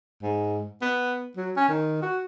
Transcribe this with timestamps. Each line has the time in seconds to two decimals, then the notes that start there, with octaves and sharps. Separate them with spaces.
0.22 G#2
0.82 B3
1.37 F#3
1.57 C#4
1.69 D#3
2.02 F#4